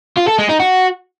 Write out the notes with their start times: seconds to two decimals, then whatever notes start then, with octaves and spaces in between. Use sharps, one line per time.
0.17 F4
0.27 A4
0.38 G#3
0.49 D#4
0.59 F#4